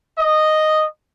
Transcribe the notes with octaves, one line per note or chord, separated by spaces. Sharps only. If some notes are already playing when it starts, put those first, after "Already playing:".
D#5